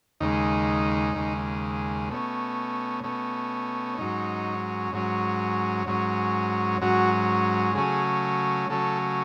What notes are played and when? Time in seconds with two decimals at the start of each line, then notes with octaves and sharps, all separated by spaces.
0.20 D#2 C#3 G#3 D#4
1.15 D#2 C#3 G#3
2.09 B2 A3 C#4
3.04 B2 A3 C#4
3.98 G#2 F#3 C#4 D#4
4.92 G#2 F#3 C#4
5.87 G#2 F#3 C#4
6.82 G#2 F#3 C#4 F#4
7.75 C#3 F#3 A3 C#4 G#4
8.70 C#3 F#3 A3 C#4 A4